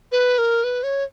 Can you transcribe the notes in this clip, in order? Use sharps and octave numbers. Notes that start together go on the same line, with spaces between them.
B4
A#4
B4
C#5